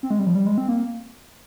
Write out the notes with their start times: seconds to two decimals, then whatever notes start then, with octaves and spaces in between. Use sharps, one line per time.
0.03 C4
0.10 G#3
0.19 G3
0.27 F3
0.35 G3
0.46 G#3
0.58 C4
0.68 A#3